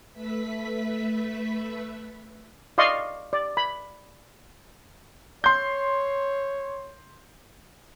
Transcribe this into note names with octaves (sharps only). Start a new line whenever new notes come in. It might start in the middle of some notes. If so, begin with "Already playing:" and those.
A3 B4 E5 B6
D5 D#5 F5 C6 C#6
D5
B5
C#5 C6 G6